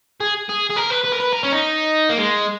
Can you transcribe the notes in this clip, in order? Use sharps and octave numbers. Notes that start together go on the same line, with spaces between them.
G#4
G#4
G#4
A#4
B4
B4
A#4
B4
A#4
C#4
D#4
A#3
G#3